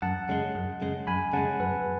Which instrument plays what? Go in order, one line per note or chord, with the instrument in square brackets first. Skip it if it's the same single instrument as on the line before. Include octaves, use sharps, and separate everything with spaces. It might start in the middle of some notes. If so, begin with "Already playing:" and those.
[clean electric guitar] F#2 [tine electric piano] F#5 A5
[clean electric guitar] C#3 G#3
F#2
C#3 G#3
[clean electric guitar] F#2 [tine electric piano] G#5 B5
[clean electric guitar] C#3 G#3 [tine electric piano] F#5 A5
[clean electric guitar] F#2 [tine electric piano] B4